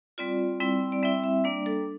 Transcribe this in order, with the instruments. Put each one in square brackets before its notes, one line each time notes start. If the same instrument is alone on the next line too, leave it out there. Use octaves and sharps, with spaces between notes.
[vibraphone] G3 C4 F4 D5
G3 C4 E4
D5
G3 C4 E4 E5
E5
G3 A#3 D4 D5
A4